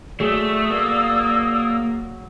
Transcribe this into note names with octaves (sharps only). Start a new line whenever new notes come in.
F#3 A3 G#4 D5 D#6 E6
A#3